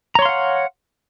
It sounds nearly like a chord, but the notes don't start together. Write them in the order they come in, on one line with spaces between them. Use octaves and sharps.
A#5 C#5 C6 F5 F#5